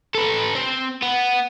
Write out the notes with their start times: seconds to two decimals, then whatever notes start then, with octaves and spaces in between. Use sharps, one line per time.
0.15 A4 B4
0.55 C4
1.02 B3